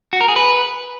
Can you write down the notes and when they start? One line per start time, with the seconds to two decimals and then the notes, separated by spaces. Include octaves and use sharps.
0.13 F#4
0.21 A#4
0.28 G#4
0.36 B4